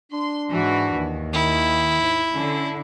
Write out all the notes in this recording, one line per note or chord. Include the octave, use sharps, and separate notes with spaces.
D4 C6
G#2 E3 F#4
D#2
D#3 E4
G#2
D3 C#4